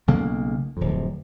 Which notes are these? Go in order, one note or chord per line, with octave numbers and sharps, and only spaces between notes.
B1 C#3 A3 A#3
D1 F2